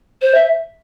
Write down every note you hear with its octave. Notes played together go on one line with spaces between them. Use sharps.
C5
E5